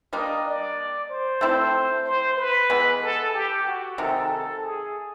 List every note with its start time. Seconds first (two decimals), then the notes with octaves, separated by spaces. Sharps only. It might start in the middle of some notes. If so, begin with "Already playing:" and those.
0.13 G3 A#3 D4 D#5
0.45 D5
1.10 C5
1.41 A3 C4 E4 A4
2.05 C5
2.37 B4
2.70 E3 G#3 B3
3.02 A4
3.34 G4
3.66 F#4
3.98 C3 D#3 G#3 A4
4.31 A4
4.63 G#4